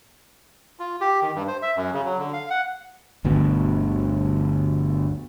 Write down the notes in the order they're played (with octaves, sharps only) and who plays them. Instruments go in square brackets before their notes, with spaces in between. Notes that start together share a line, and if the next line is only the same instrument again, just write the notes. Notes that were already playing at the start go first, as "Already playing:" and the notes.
[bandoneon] F4
G4
D#3
G2
C5
E5
F#2
C#3
F#3
D3
F5
F#5
[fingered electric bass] G1 D2 B2